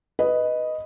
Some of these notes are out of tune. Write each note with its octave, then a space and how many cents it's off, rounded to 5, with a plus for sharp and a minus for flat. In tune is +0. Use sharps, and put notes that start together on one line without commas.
B4 +0 D#5 +0